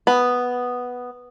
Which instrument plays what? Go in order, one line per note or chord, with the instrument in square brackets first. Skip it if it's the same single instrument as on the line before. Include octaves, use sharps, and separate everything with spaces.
[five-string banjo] B3